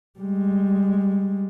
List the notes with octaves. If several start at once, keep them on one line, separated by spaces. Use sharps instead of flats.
G3 G#3